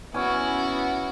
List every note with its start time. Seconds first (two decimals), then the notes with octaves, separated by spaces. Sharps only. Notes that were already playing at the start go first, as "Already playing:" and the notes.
0.14 B3 C#4 E4 F#4 G#5